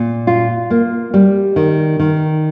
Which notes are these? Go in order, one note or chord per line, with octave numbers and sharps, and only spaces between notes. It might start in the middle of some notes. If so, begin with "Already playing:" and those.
Already playing: A#2
F4
A#3
G3
D#3
D#3